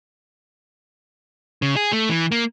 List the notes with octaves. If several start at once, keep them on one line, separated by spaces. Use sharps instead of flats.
C#3
G#4
A3
E3
A#3